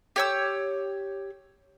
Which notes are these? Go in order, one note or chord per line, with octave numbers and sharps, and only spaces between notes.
G4 C#5 E6